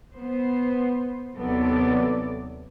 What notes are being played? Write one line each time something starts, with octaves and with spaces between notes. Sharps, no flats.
B3 C5
D#2 C3 F#3 B3 A4 D5